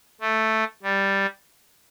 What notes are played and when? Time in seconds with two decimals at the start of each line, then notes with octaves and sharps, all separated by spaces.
0.21 A3
0.83 G3